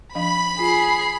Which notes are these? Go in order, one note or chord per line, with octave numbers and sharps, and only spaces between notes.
F3 D4 F5 B5
F4 G#4 C7